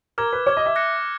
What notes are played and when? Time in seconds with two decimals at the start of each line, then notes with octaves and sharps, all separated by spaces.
0.18 A#4 D6 F6 G#6
0.33 B4
0.46 C#5 D6 F6 G#6
0.57 D#5
0.66 E5
0.76 D6 F#6 A#6 C#7